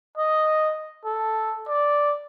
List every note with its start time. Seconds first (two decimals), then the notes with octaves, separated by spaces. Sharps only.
0.18 D#5
1.05 A4
1.68 D5